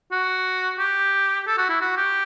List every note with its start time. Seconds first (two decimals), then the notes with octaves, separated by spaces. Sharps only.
0.12 F#4
0.79 G4
1.47 A4
1.58 F#4
1.69 E4
1.81 F#4
1.97 G4